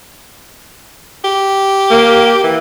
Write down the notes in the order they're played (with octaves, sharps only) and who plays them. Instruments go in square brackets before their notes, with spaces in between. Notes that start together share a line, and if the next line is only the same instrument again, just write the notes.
[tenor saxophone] G4
[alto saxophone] A#3
[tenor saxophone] E3